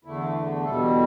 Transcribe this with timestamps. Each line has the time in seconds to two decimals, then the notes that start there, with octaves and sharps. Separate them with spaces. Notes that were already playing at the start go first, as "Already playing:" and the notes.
0.05 E2 D3 A3 E4
0.65 E2 B2 G3 A4